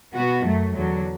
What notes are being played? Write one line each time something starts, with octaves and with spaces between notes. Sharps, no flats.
B2 B3 F#4
F#2 F#3 A3
E2 D3 F#3